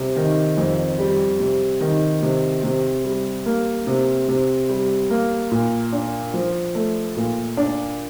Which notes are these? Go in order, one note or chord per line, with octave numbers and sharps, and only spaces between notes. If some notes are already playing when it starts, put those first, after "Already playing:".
Already playing: C3 G3
D#3
F2
G3
C3
D#3
C3
C3
G3
A#3
C3
C3
G3
A#3
A#2
D4
F3
A3
A#2
D4